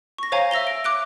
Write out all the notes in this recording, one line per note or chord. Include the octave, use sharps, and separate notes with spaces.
C#6 A#6
C5 C#5 F5 G#5 A#5 G#6
E5 E6 A#6 F7 G7
D7
D6 F#6 D7